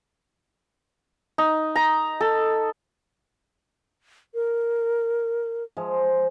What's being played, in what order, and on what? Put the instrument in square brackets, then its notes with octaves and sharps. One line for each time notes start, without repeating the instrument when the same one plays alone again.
[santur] D#4
A#5
A4
[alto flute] A#4
[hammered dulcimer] F3 G#3